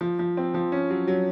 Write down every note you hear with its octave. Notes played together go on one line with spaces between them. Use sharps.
F3
F3
C4
F3
C#4
F#3
F#3